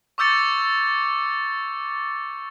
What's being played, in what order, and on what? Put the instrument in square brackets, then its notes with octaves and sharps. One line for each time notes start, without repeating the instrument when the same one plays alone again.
[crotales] C#6 D6 E6 G6 A6 C#7